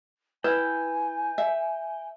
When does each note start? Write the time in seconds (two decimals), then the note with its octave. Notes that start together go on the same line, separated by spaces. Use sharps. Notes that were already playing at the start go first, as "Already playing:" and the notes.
0.44 E4 B4 G5 G#5
1.38 E5